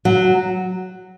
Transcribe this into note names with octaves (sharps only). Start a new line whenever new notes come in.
F#3